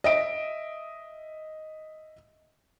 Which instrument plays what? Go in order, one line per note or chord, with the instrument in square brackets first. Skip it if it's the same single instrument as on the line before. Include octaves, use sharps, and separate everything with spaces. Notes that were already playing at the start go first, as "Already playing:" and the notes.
[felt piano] D#5 E5 D7